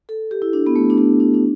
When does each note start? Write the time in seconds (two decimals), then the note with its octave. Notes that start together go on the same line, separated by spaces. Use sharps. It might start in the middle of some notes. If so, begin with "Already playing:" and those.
0.09 A4
0.31 G4
0.42 E4
0.53 D4
0.66 B3
0.76 A3
0.90 D4
0.98 B3
1.20 D4
1.34 D4